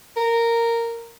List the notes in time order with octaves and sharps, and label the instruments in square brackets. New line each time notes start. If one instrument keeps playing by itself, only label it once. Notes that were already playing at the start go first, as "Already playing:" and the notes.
[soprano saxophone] A#4